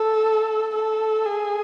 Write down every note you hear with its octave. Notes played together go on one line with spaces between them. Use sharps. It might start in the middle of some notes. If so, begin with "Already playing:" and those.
Already playing: A4
A4
G#4